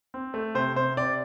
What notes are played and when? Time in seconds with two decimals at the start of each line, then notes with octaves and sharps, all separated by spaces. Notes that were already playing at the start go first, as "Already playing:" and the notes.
0.14 C4
0.34 A3
0.55 C3 C5
0.76 C3 C5
0.97 C3 D5